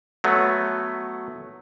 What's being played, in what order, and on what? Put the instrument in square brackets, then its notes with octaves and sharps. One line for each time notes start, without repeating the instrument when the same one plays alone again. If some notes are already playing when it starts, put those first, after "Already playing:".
[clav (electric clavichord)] F#3 A3 B3